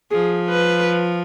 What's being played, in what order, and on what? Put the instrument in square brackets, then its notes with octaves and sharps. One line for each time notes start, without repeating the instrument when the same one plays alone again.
[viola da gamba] F3 [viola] G#4
[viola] B4